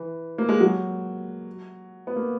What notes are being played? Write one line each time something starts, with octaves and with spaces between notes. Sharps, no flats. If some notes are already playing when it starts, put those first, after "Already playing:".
Already playing: E3
A#3
G#3
F#3
B3
A#3